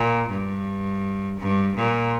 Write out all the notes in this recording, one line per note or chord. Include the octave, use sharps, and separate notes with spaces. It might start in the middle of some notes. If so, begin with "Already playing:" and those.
Already playing: A#2
G2
G2
A#2